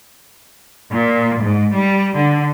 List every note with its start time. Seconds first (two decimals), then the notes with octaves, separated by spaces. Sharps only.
0.92 A#2
1.41 G#2
1.73 G3
2.14 D3